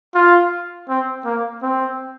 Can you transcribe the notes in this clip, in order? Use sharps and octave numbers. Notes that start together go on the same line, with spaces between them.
F4
C4
A#3
C4